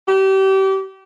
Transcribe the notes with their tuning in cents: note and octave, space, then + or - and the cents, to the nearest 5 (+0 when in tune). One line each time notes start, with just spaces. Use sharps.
G4 -30